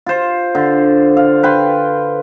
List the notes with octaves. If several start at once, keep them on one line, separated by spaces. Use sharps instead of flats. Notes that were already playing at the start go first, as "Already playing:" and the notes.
F4 C5
D3
F5
B4 G5 C6